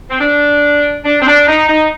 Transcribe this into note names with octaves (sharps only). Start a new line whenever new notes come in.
C4
D4
D4
C4
D4
D#4
D#4